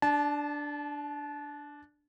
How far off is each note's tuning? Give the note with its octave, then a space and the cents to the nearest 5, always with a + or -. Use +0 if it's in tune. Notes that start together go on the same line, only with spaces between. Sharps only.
D4 +0 A5 -30